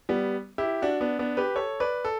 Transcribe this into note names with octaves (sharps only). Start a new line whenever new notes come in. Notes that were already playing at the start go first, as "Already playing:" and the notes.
G3 B3
E4 G4
D4 F#4
B3 D4
B3 D4
G4 B4
A4 C#5
B4 D5
A4